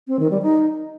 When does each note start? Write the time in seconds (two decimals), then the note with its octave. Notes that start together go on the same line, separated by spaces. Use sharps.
0.07 C4
0.19 D#3
0.31 G3
0.42 D#4